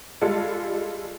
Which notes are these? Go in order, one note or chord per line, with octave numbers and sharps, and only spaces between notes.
G3 G#3 F4 A4